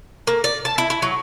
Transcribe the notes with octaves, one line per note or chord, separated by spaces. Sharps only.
A#3
D5
A5
E4
E4
F#3